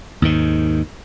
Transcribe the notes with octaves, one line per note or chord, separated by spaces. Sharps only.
D#2 G#2 D#3